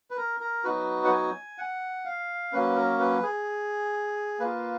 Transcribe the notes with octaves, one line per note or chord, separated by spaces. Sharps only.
B4
A#4
A#4
F#3 B3 D#4 F#4 B4
F#5
G#5
F#5
F5
F#3 A#3 C#4 B4
A#4
B4
G#4
A#3 F4 B4